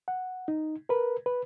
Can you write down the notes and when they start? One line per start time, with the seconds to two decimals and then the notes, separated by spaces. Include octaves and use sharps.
0.08 F#5
0.48 D#4
0.89 A#4 B4
1.26 B4